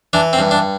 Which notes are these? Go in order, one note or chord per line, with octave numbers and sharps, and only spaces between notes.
E3 D4
C4
G2
D4